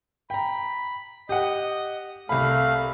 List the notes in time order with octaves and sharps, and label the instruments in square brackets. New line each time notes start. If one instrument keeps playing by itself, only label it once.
[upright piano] G5 A#5 [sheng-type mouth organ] B5
[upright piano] G4 F#5 [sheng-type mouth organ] D#5 D#6
[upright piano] C2 B5 [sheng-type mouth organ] A3 F5